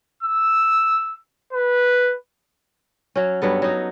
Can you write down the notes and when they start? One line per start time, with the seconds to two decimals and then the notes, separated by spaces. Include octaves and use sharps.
0.23 E6
1.53 B4
3.16 F#3 C#4
3.42 G2 F#3 B3 A4
3.62 F#3 D#4